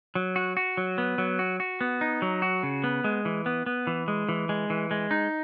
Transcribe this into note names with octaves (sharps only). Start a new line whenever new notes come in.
F#3
F#4
F#4
F#3
B3
F#3
F#4
F#4
B3
D#4
F#3
F#4
C#3
B3
G#3
E3
B3
B3
E3
G#3
E3
G#3
E3
G#3
D#4